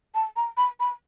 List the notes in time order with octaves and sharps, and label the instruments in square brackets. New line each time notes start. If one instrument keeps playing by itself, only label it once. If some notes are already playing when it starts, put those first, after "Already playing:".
[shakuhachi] A5
A#5
B5
B5